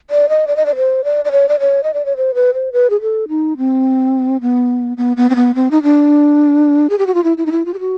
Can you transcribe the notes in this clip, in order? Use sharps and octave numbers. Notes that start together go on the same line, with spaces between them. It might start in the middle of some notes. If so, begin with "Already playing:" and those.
D5
D#5
D5
D#5
D5
C5
D5
D5
C#5
D5
C#5
D#5
D5
C#5
C5
B4
C5
B4
G#4
A4
D#4
C4
B3
B3
B3
C4
B3
C4
D#4
D4
G#4
G4
F#4
F4
E4
E4
D#4
E4
F4
G4
F#4